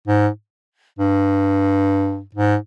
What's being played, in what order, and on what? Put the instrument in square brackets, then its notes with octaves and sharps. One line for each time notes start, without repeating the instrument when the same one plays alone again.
[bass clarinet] G#2
G2
G#2